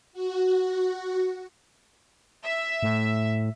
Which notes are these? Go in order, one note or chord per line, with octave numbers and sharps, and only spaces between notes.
F#4
E5
A2